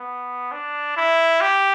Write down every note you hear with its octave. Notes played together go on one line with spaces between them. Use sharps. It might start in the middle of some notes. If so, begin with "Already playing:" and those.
Already playing: B3
D4
E4
G4